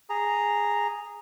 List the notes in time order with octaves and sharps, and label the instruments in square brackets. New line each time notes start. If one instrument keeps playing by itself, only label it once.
[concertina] G#4 A#5